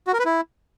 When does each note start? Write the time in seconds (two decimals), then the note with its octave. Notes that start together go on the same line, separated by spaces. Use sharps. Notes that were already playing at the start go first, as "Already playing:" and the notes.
0.07 F#4
0.13 A#4
0.19 B4
0.25 E4